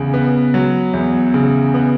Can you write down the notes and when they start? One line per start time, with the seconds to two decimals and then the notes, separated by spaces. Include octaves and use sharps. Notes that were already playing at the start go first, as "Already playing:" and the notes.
Already playing: E2 C#3
0.14 B3
0.54 F#3
0.93 E2
1.34 C#3
1.74 B3